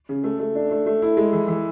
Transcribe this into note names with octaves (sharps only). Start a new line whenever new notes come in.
C#3
A3
A3
D4
A3
A3
E4
G#3
E3
E3